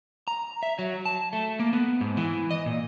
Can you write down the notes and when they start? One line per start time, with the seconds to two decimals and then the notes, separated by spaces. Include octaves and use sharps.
0.28 A#5
0.63 E5
0.79 F#3
1.06 A5
1.33 A3
1.60 A#3
1.73 B3
2.01 G#2
2.17 E3
2.51 D#5
2.66 A#2